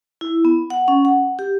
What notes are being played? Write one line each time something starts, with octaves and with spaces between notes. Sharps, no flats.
E4
B3
F#5
C#4
F#5
G4